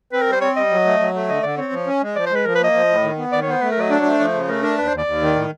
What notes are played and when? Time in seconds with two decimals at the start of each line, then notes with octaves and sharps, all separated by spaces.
0.12 C4 B4
0.22 A#4
0.27 G3
0.32 C5
0.41 C4 C#5
0.56 G3 D#5
0.71 F#3
0.85 A3
1.00 F#3
1.14 A3
1.29 D3 D#5
1.43 D3 D5
1.57 C4 C#5
1.72 F3
1.87 C#4
2.02 G#3
2.16 F3 D5
2.26 C5
2.31 G#3 B4
2.45 F3 A#4
2.55 B4
2.60 A#3 D#5
2.74 F3
2.89 A2
3.03 D#3
3.17 B3
3.32 D#3 D5
3.43 C#5
3.47 B3 C5
3.61 A3 B4
3.72 A#4
3.76 F#3 D#5
3.90 D4 D5
4.00 C#5
4.05 A3 C5
4.19 F3 C#5
4.26 C5
4.34 C#3
4.48 A3 A#4
4.63 D4 A#4
4.77 D#2 B4
4.87 C5
4.92 D#2
4.98 D5
5.06 D#2
5.21 D#3
5.36 A2